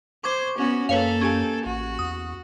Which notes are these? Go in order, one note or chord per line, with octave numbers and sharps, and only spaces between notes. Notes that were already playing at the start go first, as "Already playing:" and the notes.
C5 C#6 D6 G#6
B3 C#4 F#4
F#2 A#3 A4 B4 C#5 F5
C#4 G4 G#5
A1 F#4
E2 D#6